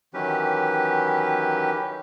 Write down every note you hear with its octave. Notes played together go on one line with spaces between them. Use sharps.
D#3 E3 F#3 C#4 G4 B4